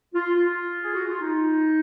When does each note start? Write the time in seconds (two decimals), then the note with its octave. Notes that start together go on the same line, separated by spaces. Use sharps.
0.15 F4
0.37 F4
0.82 G#4
0.95 F#4
1.08 F4
1.21 D#4